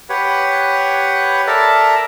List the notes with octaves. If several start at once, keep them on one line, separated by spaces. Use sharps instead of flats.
G4 B4 C#5 F#5
A4 A#4 D5 E5 A5 A#5